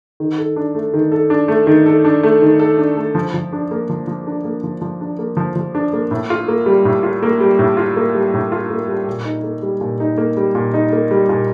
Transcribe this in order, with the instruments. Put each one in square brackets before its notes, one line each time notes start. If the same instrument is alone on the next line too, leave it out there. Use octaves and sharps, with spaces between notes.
[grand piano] D#3
A4
D4
A3
D#3
A4
D4
A3
D#3
A4
D4
A3
D#3
A4
D4
A3
F3
F3
D4
A#3
F3
F3
D4
A#3
F3
F3
D4
A#3
F3
F3
D4
A#3
A2
F4
A#3
G3
A2
F4
A#3
G3
A2
F4
A#3
G3
A2
F4
A#3
G3
A#2
D#4
A#3
G3
A#2
D#4
A#3
G3
A#2
D#4
A#3
G3
A#2